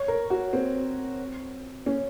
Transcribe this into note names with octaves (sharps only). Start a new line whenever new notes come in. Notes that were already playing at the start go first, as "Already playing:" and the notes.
Already playing: C#5
A#4
F#4
C4
C#4